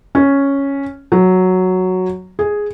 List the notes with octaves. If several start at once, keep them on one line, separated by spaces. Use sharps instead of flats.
C#4
F#3
G#4